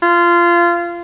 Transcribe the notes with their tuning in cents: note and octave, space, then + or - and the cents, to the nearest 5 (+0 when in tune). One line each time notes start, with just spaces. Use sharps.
F4 -20